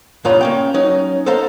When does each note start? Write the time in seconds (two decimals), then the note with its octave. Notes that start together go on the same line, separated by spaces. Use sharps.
0.25 G2 A#2 C#3 F4 A#5 B5
0.41 A#3 C#4 G5
0.74 F#3 C#4 D#4 D#5
1.26 A4 C5 D#5 F5 A#5